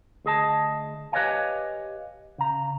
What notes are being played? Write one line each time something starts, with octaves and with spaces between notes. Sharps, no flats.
D2 G#4 D#5 A5
G4 B4 C#5 D#5 F5 G#5
C#3 A#5